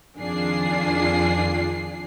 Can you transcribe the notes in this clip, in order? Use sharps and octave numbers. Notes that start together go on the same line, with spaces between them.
F2 D#3 D4 F4 G#4 C7